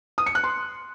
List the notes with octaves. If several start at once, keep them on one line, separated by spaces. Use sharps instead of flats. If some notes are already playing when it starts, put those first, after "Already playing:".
D#6
C#7
F#6
C6